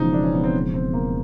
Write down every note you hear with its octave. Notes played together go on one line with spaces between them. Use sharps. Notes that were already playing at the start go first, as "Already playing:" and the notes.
Already playing: E1 E2 C#3 F3 D#4
D4
C#4
B3
C4
C4
A#3